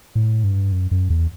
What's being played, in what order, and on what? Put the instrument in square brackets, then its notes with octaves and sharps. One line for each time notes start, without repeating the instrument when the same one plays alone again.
[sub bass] A2
G2
F#2
F#2
E2